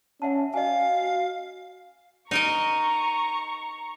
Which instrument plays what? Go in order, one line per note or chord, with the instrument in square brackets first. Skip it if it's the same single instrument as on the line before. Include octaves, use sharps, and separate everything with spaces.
[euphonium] C#4 [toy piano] E5 F#5 A5
[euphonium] F#4 [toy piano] D#5 G#5 [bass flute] F5
[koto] D#4 A#4 D#5 [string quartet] A#5 C#6